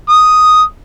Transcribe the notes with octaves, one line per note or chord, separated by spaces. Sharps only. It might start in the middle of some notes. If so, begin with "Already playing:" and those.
D#6